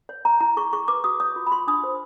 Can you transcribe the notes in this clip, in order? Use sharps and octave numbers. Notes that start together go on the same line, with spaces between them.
C#5
C#5 A#5
E4 A#5
G#4 C#6
G#4 C#6
B4 D6
F#4 D#6
C#5 D#6
F4
B5
F4 C6
D4 D#6
C5